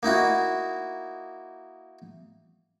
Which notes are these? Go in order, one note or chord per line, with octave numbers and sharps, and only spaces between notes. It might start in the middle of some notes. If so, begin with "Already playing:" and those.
A#3 D#4 E4 F#4